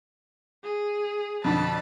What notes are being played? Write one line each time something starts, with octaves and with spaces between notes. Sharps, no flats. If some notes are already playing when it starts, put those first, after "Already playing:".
G#4
F2 B2 D3 A5 B5